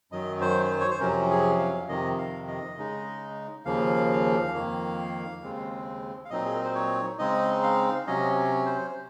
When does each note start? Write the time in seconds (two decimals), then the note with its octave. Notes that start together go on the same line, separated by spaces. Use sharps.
0.12 F#2 D#3 F#3 D#5
0.41 C5
0.70 C5
0.80 C#5
0.91 C5
1.00 F2 C3 F#3 C#4 A#4
1.30 G#4
1.59 F5
1.89 F2 C3 D#3 D#5
2.18 F5
2.47 D#5
2.77 C#3 G#3 D#4
3.65 D#2 C#3 F3 A#3 F5
4.54 F2 D#3 A#3
5.42 D#2 C#3 G#3 C4
6.25 F5
6.30 A#2 F#3 C4 D#4 D#5
6.45 G#4
6.54 A#4
6.64 C5
6.75 C#5
7.18 C#3 G#3 C4 D#4 D#5
7.63 F5
8.07 C3 F#3 C#4 D#5
8.66 C5